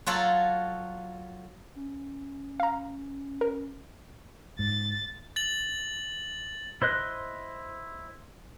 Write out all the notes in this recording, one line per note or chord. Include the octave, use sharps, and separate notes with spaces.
F#3 F4 F#4 A4
C#4
F5 A#5
A#4
G#2 A6
A6 F#7
E4 C5 D#5 F#6